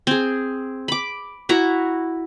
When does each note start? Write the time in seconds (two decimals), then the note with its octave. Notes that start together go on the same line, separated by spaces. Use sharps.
0.07 C4 G#4
0.88 B5 D6
1.49 E4 F#4 A#5